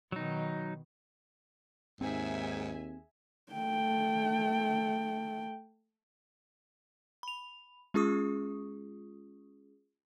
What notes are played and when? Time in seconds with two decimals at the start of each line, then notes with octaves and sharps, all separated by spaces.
0.12 B2 D#3 F#3 D#4
2.01 D#2 G#2 C4 G#4 E5 G#5
3.52 A3 G5
7.23 B5 F7
7.94 G#3 C#4 F4 G#4 C#6 D#6